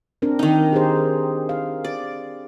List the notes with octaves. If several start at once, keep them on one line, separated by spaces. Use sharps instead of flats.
C4 D4 A#4
D#3 D#4
G4 G#4 C5
F5
D5